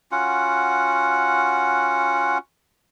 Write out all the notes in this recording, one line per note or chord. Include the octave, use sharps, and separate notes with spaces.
C#4 F4 F#4 F#5